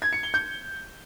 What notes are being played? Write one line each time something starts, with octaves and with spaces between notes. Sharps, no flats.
G#6
C#7
G7
G6